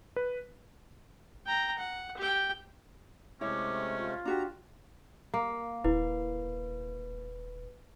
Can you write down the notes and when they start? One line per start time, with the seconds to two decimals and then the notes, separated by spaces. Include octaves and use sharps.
0.16 B4
1.46 G5 A#5
1.78 F#5
2.17 G4 G5
3.41 C3 G#3 A3 C#4 E4 C#5 E5 D6
3.97 F4
4.25 D4 F#4 G4 A#5
5.34 A#3
5.84 D#1 E4 B4